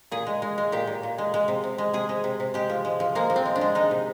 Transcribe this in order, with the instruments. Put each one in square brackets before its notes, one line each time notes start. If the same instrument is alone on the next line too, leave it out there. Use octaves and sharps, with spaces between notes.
[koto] A#2 G#4
G#3
G#3
G#3
A#2 G4
A#2
A#2
G#3
G#3
C3
C3
G#3
C3 G#4
G#3
C3
C3
G#3 G4
F3
G#3
F3
G#3 A#3
F3
C4
G#3
D4
G#3
G#3 D#4
C3